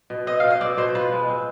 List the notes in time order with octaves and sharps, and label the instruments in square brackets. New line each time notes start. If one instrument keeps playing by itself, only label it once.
[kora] B2
[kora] C4 [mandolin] D#5
[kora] B2 [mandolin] F5
[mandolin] D#5
[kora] C4 [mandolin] D5
[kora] B2 [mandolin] C5
[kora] F4 [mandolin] B4
[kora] G#3
C4